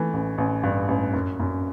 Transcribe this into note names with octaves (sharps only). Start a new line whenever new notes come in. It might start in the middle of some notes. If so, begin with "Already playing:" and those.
Already playing: E3 A3
A1
A1
G2
A1
F#2
F#2